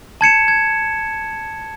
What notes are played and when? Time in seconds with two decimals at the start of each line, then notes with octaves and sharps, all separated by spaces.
0.21 A5 G#6 C#7 E7
0.48 G#6